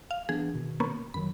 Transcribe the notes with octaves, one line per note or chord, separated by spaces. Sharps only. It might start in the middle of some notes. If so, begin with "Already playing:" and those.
F5
E3 B3 D4 G#4
B2 D#3
A#3 B3 C#4
F#2 D#3 F#3 B5